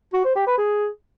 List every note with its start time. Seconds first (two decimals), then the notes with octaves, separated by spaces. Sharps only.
0.13 F#4
0.25 C5
0.36 G4
0.47 B4
0.58 G#4